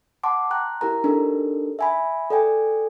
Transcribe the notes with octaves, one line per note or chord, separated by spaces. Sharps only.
F#5 A5 C6 D6
G5 A#5 F#6
E4 G4 A#4 A#5
D4 D#4 G4 A4 A#4
E5 G#5 B5
A4 D5 G5 G#5